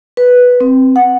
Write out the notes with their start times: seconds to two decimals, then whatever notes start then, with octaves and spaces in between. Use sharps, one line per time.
0.17 B4
0.61 C4
0.96 F#5